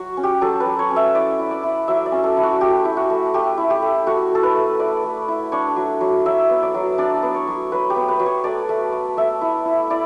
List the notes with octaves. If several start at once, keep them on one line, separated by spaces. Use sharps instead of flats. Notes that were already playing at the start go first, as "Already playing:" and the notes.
Already playing: F#3 F#4
C#4
G4
F#3 A4
B4
F#3
C#5
C#4
E5
E4 D5
E4
D5
E4
F#3 E5
D5
C#4
A4
E4
F#4
A3 G4
E4
F#4
A3
A3 G4
E4
G4
A3
A3 F#4
A3 A4
B4
A3
E4 D5
A3
E4
D4 C#5
F#3
F#3
F#3 E5
B3
D5
F#3
D4 D5
B3
C#5
F#3
F#3 B4
G4
B3
B4
F#3
C#5
A3 D5
A3
A3
A3 E5
E4
E4
E4 D5